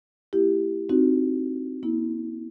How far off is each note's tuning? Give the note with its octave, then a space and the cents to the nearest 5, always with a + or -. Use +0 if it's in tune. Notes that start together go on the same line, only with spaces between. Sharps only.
A3 +0 E4 +0 G4 +0
C4 +0 D#4 +0 F#4 +5
A#3 +40 E4 -30